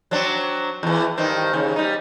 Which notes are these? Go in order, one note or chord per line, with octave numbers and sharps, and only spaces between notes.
F#3 C4 D4
E2 E3
G2 D#3 C4
D#2 C#3
G3 D#4